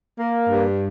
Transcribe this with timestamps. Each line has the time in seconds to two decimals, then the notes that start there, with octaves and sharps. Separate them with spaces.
0.19 A#3
0.48 G2